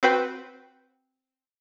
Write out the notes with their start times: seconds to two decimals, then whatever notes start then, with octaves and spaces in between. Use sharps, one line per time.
0.03 C4 F#4 B4 C5 G5